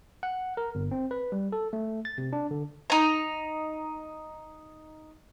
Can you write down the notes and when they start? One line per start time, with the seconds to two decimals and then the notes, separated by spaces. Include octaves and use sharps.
0.23 F#5
0.57 A#4
0.75 G1
0.91 C4
1.11 B4
1.32 G3
1.52 A4
1.73 A3
2.05 A6
2.18 C3
2.33 D4
2.51 D3
2.90 D#4 A#5